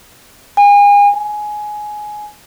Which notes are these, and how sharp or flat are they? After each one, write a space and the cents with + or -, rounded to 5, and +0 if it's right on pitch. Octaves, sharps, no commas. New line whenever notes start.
G#5 -35
G#5 +15